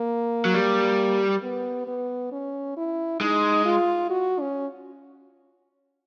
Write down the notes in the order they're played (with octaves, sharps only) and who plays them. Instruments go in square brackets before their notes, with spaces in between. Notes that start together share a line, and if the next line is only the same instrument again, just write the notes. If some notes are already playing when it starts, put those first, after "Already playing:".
Already playing: [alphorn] A#3
[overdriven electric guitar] F#3
G3
[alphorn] B3
B3
C#4
E4
[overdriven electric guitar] G#3 [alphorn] D#4
[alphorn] F4
F#4
C#4